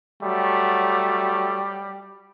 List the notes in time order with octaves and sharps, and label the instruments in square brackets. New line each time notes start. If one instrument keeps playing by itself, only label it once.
[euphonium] F#3 [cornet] G3 [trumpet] A3